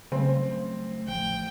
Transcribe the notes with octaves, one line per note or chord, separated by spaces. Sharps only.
C#3 F#3 G3 A3 C4
A1 F3 A3 G5